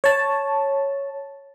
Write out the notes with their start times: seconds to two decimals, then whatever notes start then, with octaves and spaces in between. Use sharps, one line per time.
0.04 C#5 A5